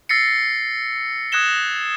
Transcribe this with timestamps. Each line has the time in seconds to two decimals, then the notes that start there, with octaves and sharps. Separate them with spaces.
0.09 E6 A6 A#6 C7 C#7
1.32 D#6 F#6 G#6 A#6 E7 G7